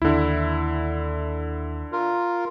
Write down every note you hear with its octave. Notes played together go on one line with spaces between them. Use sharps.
D#2 D3 E4
F4 A#4